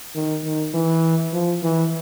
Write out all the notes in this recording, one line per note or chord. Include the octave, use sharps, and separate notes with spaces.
D#3
D#3
E3
F3
E3